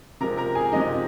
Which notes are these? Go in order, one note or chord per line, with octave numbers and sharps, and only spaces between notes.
C3 F3 G#3 A#4 A#5
A#4 A#5
G#4 G#5
C3 F3 G#3 D#4 D#5